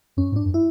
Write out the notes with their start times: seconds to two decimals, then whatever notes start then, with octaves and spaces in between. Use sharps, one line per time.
0.17 F#2 C#4
0.32 G#2
0.36 D4
0.45 F#2
0.54 E4